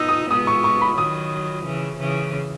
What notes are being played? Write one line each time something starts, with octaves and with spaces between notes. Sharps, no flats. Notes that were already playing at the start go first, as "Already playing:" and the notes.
Already playing: B3 D#4 E6
D#6
G#3 B3 D#6
C#6
C#6
B5
D#3 F#3 D#6
C#3 E3
C#3 E3